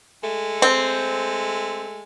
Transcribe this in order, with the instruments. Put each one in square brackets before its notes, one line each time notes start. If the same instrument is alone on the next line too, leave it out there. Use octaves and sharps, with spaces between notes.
[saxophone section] G#3 A3 A4
[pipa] C4